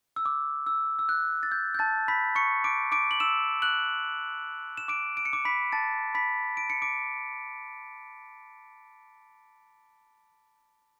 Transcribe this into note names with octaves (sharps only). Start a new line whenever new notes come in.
E6
D6
E6
E6
F#6
A6
G6
G6
A5 A6
B5 B6
C#6 C#7
D6 D7
D6 D7
F#7
E6 E7
F#6 F#7
E7
D6 D7
D7
C#7
D6 D7
B5 B6
A5 A6
B5 B6
D7
C#7
D6 D7